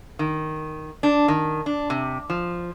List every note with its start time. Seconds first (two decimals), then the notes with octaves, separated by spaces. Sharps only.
0.19 D#3
1.03 D4
1.28 D#3
1.66 D4
1.90 C3
2.30 F3